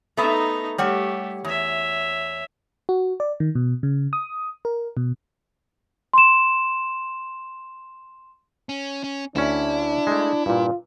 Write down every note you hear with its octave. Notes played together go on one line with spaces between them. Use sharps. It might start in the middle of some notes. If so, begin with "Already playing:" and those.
A3 B3 D#4 E5 A#5
G3 A3 G4 C#5 F#5
E2 C#5 E5
F#4
D5
D#3
B2
C#3
D#6
A#4
B2
C6 E7
C#4
C#4
D2 C#4 D4 E4
G#3 A3
G2 A#2 F4